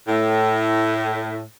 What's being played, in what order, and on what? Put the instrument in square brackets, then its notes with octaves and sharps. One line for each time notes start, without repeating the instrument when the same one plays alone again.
[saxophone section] A2